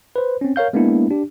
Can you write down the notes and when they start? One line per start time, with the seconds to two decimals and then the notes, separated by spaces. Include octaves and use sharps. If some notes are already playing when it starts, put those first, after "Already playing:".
0.16 B4 C5
0.41 C4 C#4
0.56 A#4 C#5 F5 G6
0.73 G#3 A#3 B3 D4 E4
1.11 D4 G4